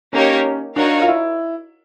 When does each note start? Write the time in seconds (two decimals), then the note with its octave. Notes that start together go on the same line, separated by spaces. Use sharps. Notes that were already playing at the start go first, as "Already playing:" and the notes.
0.13 A#3 C#4 D#4 G4 A#4 C#5
0.76 D4 D#4 F#4 A#4 C#5 F5
1.02 F4
1.08 E4